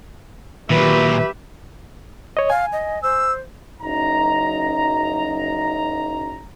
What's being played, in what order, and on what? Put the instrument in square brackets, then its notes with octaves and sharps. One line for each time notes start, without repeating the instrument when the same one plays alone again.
[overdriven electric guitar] A#2 F#3 [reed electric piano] D#3 [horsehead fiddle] G4 E5 [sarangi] B4
[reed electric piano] C#5 D#5
[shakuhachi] F5 [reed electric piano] G#5
[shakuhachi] D#5
[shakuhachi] C5 [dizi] E6
[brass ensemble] F#1 F#2 D#4 A#5